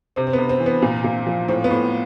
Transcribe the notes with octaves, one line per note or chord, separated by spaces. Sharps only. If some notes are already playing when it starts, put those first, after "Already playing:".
C3 C4
C4
B3
C3
C4
E3
B3
A#2
A#2
F3
A2 C4
B3
A2